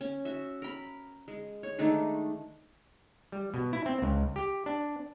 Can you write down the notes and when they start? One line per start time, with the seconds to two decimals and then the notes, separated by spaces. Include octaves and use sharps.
0.01 C#4
0.25 F#4 E5
0.62 A#4 B5
1.28 G#3
1.63 C#5
1.78 D#3 G#3 A3 D4
3.32 G3
3.54 B2
3.73 E4
3.86 C4
4.02 C#2
4.36 G4
4.66 D4